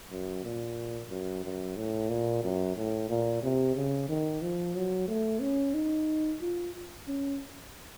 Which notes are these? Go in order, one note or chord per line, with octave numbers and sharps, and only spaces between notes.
F#2
A#2
F#2
F#2
A2
A#2
F#2
A2
A#2
C3
C#3
D#3
F3
F#3
A3
C#4
D#4
F4
C#4